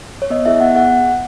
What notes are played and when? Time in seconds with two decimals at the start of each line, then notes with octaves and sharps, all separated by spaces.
0.22 C#5
0.30 B3 D#5
0.46 E4 G#4 E5
0.60 B3 F#5
0.75 G#4 F#5